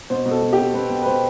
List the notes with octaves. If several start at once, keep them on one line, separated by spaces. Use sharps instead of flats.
B2 C5
B2
A4
B2
G4
B2
B2 B4
B2
B4
B2 C5